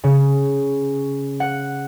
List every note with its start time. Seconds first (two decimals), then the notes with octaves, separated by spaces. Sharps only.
0.04 C#3
1.40 F#5